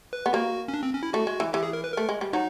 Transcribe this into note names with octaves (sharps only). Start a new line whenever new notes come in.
B4
B3
A#3 F#4
C#4
D4
C4
C#4
E4
A3 F#4
G#3
E3
E3 G4
G#4
A#4
B4
A3 A#4
G#3
G3
F#3 D#4